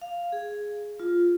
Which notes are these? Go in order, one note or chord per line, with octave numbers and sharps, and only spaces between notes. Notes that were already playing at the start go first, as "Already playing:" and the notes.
F5
G#4
F4